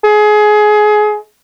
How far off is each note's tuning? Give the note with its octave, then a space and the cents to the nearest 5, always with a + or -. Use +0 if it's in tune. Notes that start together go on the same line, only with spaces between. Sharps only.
G#4 +25